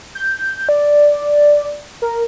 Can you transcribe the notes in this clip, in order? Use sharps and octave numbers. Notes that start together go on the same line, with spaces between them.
G6
D5
A#4